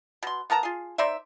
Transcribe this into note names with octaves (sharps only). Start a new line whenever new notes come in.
B2 C6
B3 A#4 A5 A#5
F4 G#4
D#4 C5 D5 E5